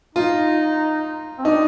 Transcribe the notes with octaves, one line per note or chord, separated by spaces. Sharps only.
D#4 F4
C4
D4 D#4